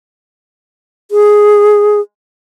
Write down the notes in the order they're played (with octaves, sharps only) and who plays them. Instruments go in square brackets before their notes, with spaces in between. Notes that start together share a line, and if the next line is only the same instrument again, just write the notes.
[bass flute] G#4